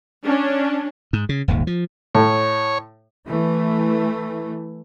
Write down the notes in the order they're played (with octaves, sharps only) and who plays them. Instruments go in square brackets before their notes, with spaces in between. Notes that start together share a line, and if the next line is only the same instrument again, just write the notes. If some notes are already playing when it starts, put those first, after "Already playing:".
[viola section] C#4 D4
[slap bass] G#2
C#3
D#1 G#1 D#2
F3
[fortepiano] A2 [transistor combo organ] C#5
[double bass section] E3 A3